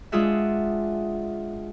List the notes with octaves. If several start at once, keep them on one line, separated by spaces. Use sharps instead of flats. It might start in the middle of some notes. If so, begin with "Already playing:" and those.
G#3 D4 F4 G#4 E5 F#5